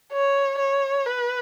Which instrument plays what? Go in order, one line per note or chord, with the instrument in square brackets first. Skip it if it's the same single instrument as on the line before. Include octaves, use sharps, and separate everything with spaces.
[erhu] C#5
C#5
B4